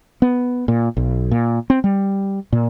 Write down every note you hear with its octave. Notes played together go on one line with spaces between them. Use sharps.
B3
A#2
B1
A#2
C4
G3
A#2